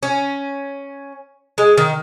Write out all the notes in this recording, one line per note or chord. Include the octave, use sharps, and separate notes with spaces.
C#4
G#3
D#3